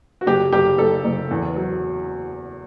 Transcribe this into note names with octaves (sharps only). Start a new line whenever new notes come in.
F#4
F#1 G4
F#1 G4
F#1 A4
F#1
E2
F#3